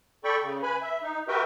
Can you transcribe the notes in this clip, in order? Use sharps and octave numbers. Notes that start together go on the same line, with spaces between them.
A4 D5 G5 B5 C#6
C#3
B4 G#5 B5
E5
D#4
F#4 G4 A#4 B4 E5 G5